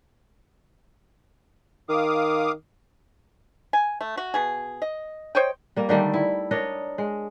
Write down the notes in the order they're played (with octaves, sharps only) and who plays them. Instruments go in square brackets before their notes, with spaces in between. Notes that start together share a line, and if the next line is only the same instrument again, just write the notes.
[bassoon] D#3 [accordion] F5 D6 D#6
[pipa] G#5
A3
F#4
B2 G#4
D#5
C5 C#5 D#5 G5
[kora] G3 A#3
D3 D#3 G3 A3
E4
D4 A#4 C#5 D#5
G#3